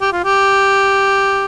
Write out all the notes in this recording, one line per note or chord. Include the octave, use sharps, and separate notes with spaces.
G4
F4
G4